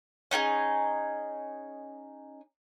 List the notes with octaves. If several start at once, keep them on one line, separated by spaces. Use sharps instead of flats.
C#4 D#4 F#4 G#4